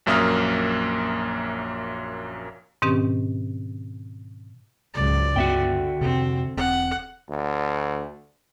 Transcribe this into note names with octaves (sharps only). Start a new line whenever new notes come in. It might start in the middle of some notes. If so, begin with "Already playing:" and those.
A#1 F#2 A#3 E5 D#6 F6
G#2 B2 D#3 C4 C#4 G4
C#2 G#2 F#3 D5
G2 D3 B3 F#4 E5 G5
F2 C3 C4
E1 C4 F#5
D2